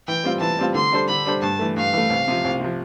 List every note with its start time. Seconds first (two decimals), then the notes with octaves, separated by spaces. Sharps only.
0.08 E3 G5
0.24 G3 C4 F4
0.41 E3 A5
0.59 G3 C4 F4
0.75 D3 C6
0.92 G3 D4 A4 C5
1.09 D3 B5
1.26 G3 D4 A4 C5
1.42 G2 A5
1.59 E3 A3
1.76 G2 F5
1.93 E3 A3
2.10 C2
2.28 C3 F3
2.45 C2
2.60 C3 F3